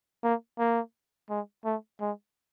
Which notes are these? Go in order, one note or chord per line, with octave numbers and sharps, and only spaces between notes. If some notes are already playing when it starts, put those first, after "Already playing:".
A#3
A#3
G#3
A3
G#3